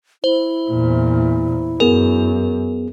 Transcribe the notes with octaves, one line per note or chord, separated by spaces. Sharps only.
E4 C5
E2 A#2
F#2 B3 G#4 A#4